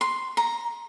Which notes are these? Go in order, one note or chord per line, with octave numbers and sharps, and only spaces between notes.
C6
A#5